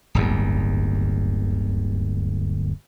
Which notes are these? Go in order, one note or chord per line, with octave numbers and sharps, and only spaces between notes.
D1 G1 D#2